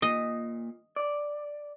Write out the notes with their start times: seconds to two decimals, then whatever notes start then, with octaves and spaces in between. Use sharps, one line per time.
0.02 A#2 D#5
0.96 D5